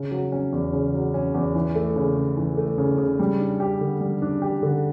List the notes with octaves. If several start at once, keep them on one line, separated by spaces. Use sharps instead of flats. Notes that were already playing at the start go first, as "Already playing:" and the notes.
Already playing: C#3
F#3
C#4
E2
C#3
F#3
C#4
E2
E3
A3
C#3
C#3
E3
A3
C#3
C#3
G3
D4
G4
D3
G3
D4
G4
D3